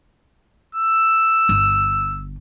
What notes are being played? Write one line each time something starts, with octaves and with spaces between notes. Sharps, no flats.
E6
G1